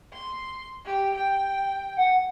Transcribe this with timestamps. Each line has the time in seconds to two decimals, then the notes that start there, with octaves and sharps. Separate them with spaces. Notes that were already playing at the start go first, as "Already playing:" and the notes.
0.14 C6
0.85 G4
1.15 G5
1.97 F#5